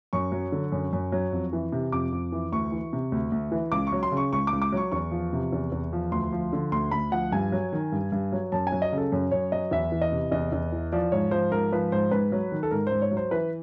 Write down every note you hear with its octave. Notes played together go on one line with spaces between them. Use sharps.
F#2 C#6
F#3
D3
F#2
F#2
F#3
F2
E3
C3
F2 D6
F2
E3
D2 C#6
E3
C3
D2
D2
E3
C#2 D6
C#6
F#3
C6
C#3
C#6
C#2 C#6
D6
C#2
D6
F#3 C#6
E2 C#6
F3
C3
E2
E2
F3
D2 C6
F3
D3
D2 C6
D2 B5
F3 F#5
G2 G#5
F#3
D#3
G2
G2
F#3
F#2 A5
G#5
F#3
D#5
C#3
A4
F#2
F#2 C#5
F#3 D#5
E2 E5
E3
D#5
C3
E2 D#5
E2
E3
F3 D5
G#2 C#5
F3 C5
G#2 A#4
F3 B4
G#2 C5
G#2 B4
F#3
D#3
A4
G#2 A#4
G#2 C5
C#5
F#3
C5
E3 B4